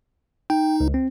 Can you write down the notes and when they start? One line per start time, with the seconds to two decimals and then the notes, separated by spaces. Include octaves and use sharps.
0.50 D#4 G5
0.80 C#2
0.94 C4